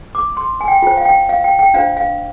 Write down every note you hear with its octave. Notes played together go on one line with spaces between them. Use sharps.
D6
C6
G#5
G5
F4 C5 G5
F5
G5
F5
G5
G5
D4 F4 C5 F5
F5